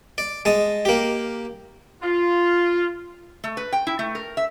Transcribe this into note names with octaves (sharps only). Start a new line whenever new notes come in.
D5
G#3 A5 D#6
A#3 G4
F4
A3
B4
G5
E4
A3
A#4
E5